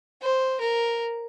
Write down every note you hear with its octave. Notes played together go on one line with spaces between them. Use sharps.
C5
A#4